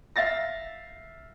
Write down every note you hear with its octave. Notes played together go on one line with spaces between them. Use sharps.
E5 F5 A6 A#6